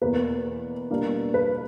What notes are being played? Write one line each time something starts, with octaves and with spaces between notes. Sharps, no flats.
E2 B2 A#3 B4
B2 G3 A#3 D4
B4